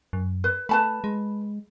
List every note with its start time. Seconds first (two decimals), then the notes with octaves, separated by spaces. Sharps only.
0.13 F#2
0.44 B4
0.69 A3 B4 A5 B5
1.04 G#3